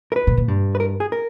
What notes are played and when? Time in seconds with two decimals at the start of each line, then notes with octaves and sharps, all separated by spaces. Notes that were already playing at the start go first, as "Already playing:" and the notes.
0.12 A#4
0.16 B4
0.27 A#2
0.37 A#2
0.48 G2
0.75 B4
0.80 A#4
1.00 G#4
1.12 A#4